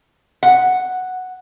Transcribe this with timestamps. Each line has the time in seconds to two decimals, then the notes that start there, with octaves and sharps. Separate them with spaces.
0.43 F#5